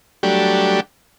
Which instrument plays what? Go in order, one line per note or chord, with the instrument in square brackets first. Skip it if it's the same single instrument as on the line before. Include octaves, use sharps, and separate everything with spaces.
[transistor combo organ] F#3 G3 A3 D4 G4